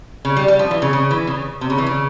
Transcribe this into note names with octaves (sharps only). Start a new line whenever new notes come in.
C#3
G3
G3
F3
E3
C#3
C#3
E3
C#3
C3
C#3
E3
C#3